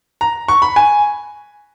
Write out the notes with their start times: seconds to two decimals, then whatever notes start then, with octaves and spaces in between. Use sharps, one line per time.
0.21 A#5
0.48 C#6
0.62 B5
0.76 G#5